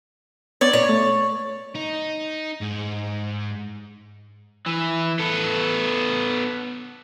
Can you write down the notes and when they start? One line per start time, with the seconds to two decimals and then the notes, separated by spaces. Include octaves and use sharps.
0.61 B3 C#5 D5 G#6
0.73 A#2 C#5 D5
0.89 A3
1.75 D#4
2.62 G#2
4.66 E3
5.19 B3 A4